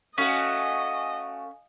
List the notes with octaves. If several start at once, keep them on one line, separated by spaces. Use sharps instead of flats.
A3 C#4 F#4 D#5 F5 G#5